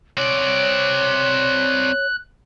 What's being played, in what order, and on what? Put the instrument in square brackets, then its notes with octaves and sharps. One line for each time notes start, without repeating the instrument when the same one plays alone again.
[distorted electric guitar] C4 D5 [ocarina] C#5 [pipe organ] F#6